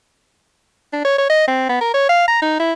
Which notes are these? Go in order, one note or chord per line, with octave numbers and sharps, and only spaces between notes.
D4
C#5
C#5
D#5
C4
B3
A#4
C#5
F5
A#5
D#4
E4